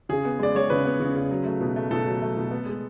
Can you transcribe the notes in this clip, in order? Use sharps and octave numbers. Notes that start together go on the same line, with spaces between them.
C#3 G#4
B3
G#3 D5
G#3 C#5
C#3 B4
B3
C#3
C#3
F#3
A3
B2
A3
B2 A4
F#3
A3
B2
B3
G#3